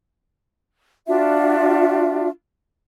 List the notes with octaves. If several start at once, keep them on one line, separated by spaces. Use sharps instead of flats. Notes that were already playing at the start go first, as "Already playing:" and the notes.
D4 F4 F#4 E5